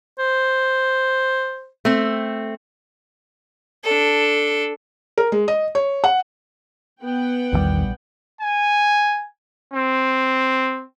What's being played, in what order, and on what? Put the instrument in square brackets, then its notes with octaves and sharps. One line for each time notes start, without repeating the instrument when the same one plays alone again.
[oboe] C5
[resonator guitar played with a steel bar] A3 C4
[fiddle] D4 A4
[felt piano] A#4
G#3
D#5
C#5
F#5
[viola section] B3 F#5 G5
[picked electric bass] A#1 D3 G3 [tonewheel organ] E2 D#3
[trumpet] G#5
C4